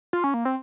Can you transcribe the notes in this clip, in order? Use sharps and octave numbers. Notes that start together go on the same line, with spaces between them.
F4
C#4
A#3
C4